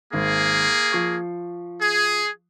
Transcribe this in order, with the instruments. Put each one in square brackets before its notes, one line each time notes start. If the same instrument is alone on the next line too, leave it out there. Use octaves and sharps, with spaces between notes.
[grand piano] G#1 [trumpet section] A#3 G#4
[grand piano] F3 C#6 C7
[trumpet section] G#4